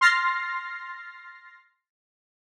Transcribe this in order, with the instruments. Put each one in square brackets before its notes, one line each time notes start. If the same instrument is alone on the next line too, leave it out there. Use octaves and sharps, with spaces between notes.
[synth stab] C6 F6 A6 A#6 C7